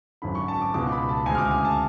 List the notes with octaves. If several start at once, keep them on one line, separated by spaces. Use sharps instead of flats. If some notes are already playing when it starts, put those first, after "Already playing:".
G#1 F#2 D3 B5
C#6
A5
D6
C#2 B2 G#3 D6
B5
A5
D2 C#3 G#3 G#5
F6
D6
G#5
A5